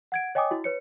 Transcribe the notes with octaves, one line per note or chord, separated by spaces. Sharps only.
F#5 G#6 D7
C#5 D#5 G5 G#5 D6 D#6
E4 F#4
B4 C#5 C#7